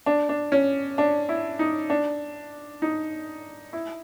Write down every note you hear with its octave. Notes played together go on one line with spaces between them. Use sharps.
D4
D4
C#4
D4
E4
D#4
D4
D#4
E4